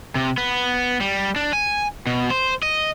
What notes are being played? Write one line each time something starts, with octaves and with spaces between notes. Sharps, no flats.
C3
B3
G3
D4
G#5
B2
C5
D#5